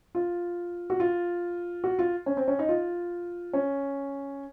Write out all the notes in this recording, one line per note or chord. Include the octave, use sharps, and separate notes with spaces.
F4
F#4
F4
F#4
F4
C#4
C4
C#4
D#4
F4
C#4